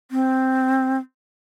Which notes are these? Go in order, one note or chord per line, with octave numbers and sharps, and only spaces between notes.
C4